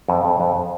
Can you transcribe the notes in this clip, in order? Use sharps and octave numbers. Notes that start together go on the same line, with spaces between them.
F2
F2
F2